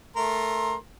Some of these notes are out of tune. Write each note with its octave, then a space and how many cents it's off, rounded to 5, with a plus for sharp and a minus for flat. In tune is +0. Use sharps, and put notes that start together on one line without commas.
A3 +0 A#4 +0 C6 +20